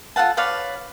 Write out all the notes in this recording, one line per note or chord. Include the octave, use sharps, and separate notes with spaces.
F4 A4 F#5 A5
B4 C#5 D5 F5